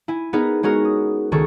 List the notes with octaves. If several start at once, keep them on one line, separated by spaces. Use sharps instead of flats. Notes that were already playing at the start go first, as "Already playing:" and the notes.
E4 G#5
B3 D#4 G#4 A#4 B4
G#3 B3 C#4 F#4 G#4 A#4
D#6
C#2 D#3 G#4 A4 C#6